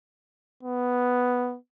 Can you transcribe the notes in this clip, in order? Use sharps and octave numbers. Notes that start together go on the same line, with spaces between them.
B3